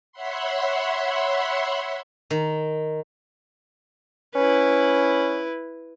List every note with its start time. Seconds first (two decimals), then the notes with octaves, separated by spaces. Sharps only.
0.12 C#5 E5 F#5 B5 C6
2.30 D#3
4.35 C#4 E4 B4